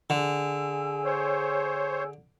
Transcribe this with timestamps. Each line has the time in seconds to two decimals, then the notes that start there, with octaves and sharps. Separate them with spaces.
0.10 D3 G#4 G#5 E6
1.05 C5 C#5